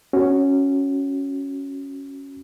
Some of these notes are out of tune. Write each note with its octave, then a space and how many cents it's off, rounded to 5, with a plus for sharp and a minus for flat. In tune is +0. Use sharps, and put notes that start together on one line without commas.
C#4 +0 F#4 +0